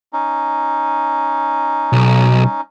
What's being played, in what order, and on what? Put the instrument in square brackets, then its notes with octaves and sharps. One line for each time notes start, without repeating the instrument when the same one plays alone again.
[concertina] C#4 D#4
[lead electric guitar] B1